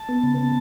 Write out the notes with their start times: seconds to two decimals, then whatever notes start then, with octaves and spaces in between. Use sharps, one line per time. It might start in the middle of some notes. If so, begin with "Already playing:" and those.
Already playing: A5
0.09 B3
0.23 C#3
0.38 B3